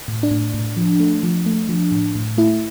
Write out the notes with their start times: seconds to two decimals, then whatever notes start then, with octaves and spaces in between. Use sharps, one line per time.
0.08 A2
0.23 D4
0.31 A2
0.54 A2
0.77 F3
1.00 A3
1.23 F3
1.46 A3
1.69 F3
1.92 A2
2.15 A2
2.38 A3 E4